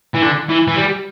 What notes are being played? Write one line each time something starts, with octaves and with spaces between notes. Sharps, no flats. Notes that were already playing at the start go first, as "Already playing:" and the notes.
E3
D3
E3
E3
G3